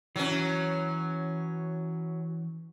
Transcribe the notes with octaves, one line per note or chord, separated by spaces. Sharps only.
E3 F#3 C#4